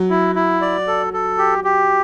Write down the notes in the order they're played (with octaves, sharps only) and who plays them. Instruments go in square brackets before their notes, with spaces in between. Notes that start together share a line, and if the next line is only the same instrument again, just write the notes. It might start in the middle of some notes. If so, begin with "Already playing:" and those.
Already playing: [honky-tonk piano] F#3
[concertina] E4
E4
D5
A4
A4
G4
G4